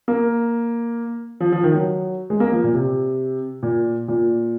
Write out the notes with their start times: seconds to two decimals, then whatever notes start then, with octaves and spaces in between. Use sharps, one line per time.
0.08 A#3
1.40 F3
1.52 F3
1.64 D#3
1.74 F#3
2.30 G#3
2.40 A#3
2.52 F3
2.64 A#2
2.74 C3
3.63 A#2
4.08 A#2